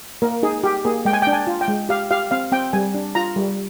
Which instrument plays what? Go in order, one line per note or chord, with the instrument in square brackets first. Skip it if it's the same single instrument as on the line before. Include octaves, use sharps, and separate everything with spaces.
[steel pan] A#3 A#4
D#4 G#4
G4
A#3 G#4
G#3 G5
G#5
D4 G5
G#5
F4
G5
G#3
G4 F5
G4 F5
C4 F5
C4 G5
G3 G#5
D4
F4 A#5
G3